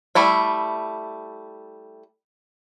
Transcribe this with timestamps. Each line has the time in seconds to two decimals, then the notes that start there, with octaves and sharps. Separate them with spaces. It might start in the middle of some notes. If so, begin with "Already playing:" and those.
0.15 G3 A3 E4 E5